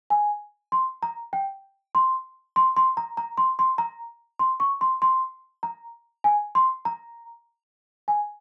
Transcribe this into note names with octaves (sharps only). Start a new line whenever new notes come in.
G#5
C6
A#5
G5
C6
C6
C6
A#5
A#5
C6
C6
A#5
C6
C#6
C6
C6
A#5
G#5
C6
A#5
G#5